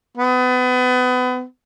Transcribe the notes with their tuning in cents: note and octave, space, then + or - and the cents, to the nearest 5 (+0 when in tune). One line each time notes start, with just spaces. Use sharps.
B3 +30